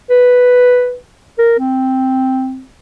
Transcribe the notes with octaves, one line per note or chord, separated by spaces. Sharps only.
B4
A#4
C4